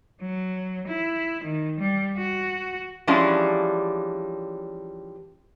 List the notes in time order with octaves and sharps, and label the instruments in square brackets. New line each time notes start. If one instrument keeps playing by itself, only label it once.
[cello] F#3
E4
D#3
G3
F#4
[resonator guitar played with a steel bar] E3 F3 G3 G#3 C#4 D4